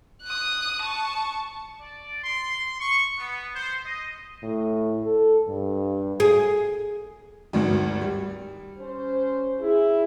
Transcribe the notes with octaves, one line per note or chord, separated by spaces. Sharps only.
D#6 F#6
A5 C#6
D5
C6
C#6
B3
C5
D#5
A2
A4
G2
G#4
G#1 D2 G2
G3
C#4 C5
E4 G#4